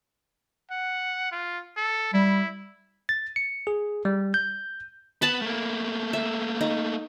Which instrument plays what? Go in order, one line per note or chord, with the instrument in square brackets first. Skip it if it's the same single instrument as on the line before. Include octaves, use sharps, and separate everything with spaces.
[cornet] F#5
F4
A4
[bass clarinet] G3 [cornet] E4
[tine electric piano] A6
C#7
G#4
G3
G6
[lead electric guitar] B3 [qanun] A5 B5
[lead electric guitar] A3 A#3
[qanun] E5
D#4